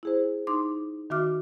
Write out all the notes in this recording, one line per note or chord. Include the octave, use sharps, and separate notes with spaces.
E4 G#4 C5
D#4 C6 D6
D#3 F#4 E5 D6 F6